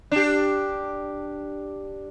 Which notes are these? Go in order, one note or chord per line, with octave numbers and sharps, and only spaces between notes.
D4 G4